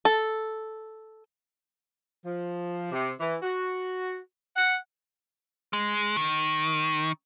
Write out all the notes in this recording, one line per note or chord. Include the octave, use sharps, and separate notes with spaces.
A4
F3
C3
E3
F#4
F#5
G#3
D#3